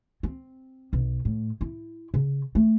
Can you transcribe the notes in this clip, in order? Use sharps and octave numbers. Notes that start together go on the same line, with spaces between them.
C4
B1
A2
E4
C#3
A3